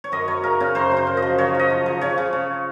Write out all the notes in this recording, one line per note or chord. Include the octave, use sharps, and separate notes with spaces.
C#5
F#2 D#5
F#2 C#5
C#3 A#4
C#3 C#5
F#2 C5
C#3
C5
F#2
D#5
F3
C#3 C#5
F3 D#5
F3
F3
C#3 C#5
C#3
C#3